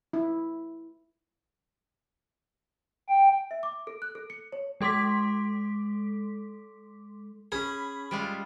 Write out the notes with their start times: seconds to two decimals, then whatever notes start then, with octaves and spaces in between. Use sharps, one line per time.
0.13 E4
3.09 G5
3.51 E5
3.63 D6
3.87 A4
4.02 F#6
4.15 A4
4.30 C#7
4.52 C#5
4.81 G#3 A4 C6 D6 B6
7.52 C#4 G#4 B5
8.11 G3 G#3 F4